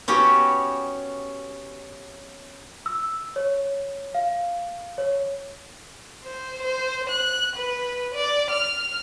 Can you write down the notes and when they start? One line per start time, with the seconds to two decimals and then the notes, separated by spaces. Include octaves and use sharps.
0.08 B3 C#4 F#4 G4
2.86 E6
3.36 C#5
4.15 F5
4.98 C#5
6.24 C5
6.62 C5
7.09 F#6
7.56 B4
8.14 D5
8.51 F6